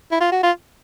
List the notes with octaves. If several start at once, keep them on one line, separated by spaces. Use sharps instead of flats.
E4
F4
F#4
F4